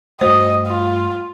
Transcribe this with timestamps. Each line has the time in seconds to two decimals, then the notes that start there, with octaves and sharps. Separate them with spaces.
0.21 G2 A3 F#4 C5 D#5
0.67 F4